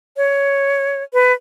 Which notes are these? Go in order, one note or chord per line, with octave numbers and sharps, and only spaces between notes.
C#5
B4